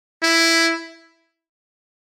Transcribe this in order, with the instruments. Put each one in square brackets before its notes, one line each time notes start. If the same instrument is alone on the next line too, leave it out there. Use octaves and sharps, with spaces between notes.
[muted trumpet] E4